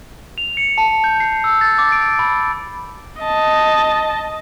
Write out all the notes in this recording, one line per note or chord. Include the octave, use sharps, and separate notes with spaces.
F7
C#7
A5
G6
C7
E6
A6
D6
D7
B5
D#5 A5